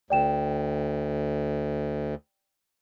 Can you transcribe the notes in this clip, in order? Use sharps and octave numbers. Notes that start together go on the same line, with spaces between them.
D2 D5 G5 E7